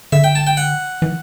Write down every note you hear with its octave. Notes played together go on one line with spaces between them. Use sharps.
D3 E5
G5
A5
G5
F#5
E3